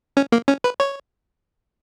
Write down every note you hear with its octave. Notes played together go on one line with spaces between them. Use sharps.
C#4
A#3
C#4
B4
C#5